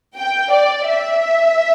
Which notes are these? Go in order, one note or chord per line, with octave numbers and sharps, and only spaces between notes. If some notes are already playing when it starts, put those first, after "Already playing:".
G5
D5
E5